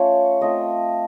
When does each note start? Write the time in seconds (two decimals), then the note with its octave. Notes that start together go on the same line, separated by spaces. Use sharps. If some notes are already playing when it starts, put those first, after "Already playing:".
Already playing: A3 C#4 F4 C#5
0.41 A3 C4 F4 D#5